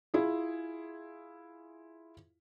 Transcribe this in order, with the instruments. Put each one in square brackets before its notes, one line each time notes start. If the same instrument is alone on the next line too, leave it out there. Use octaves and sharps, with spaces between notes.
[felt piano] E4 F4 G#4